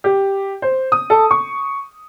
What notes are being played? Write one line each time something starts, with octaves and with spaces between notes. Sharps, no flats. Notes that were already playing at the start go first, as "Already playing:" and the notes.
G4
C5
D#6
A4
C#6